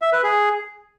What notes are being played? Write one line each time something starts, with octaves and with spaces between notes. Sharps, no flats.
E5
B4
G#4